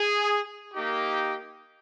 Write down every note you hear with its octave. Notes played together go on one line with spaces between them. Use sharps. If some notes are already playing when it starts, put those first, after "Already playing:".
Already playing: G#4
A#3 D#4 G4